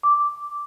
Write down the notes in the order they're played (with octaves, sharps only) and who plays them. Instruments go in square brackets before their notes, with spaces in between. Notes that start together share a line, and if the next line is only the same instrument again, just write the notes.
[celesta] D6